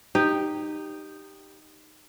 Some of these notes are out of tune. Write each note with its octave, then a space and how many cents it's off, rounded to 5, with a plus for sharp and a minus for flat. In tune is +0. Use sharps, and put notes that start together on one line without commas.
D#4 -15 G4 +0